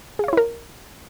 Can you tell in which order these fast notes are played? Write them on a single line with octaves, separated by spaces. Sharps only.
G#4 F5 C#5 E4 A#4